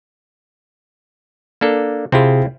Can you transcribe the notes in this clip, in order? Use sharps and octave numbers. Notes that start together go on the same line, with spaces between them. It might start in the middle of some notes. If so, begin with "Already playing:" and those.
A#3 D4 A4
C3 C4 E4 F4 G#4